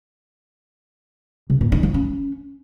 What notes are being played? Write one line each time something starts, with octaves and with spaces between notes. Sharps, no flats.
C3
A#2
D#4
F3
C#4